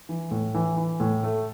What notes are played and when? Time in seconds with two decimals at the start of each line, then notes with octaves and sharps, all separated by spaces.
0.09 E3
0.31 A2
0.54 E3
0.77 E3
1.00 A2
1.24 A3